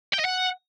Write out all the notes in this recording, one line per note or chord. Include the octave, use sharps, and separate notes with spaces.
G5
D#5
F#5